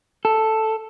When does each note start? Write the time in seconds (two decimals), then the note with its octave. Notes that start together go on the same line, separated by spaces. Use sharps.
0.25 A4